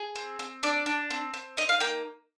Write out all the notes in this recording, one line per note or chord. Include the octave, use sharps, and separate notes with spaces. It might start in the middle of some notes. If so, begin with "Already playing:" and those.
Already playing: G#4
C4
C4
D4 D5
D4
C4
C4
D#4 D#5
F5
A#3 G5